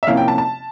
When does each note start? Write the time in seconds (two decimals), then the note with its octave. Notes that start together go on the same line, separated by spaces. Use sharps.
0.03 E5
0.07 C3 F3 A#3 C#4 E4 F5
0.17 G5
0.28 A5
0.38 A5